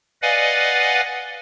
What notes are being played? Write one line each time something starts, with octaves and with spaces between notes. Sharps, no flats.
B4 D5 D#5 F5 F#5 G#5